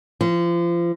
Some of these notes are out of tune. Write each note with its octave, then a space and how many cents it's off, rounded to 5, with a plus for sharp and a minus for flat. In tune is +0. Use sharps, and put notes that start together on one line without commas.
F3 -30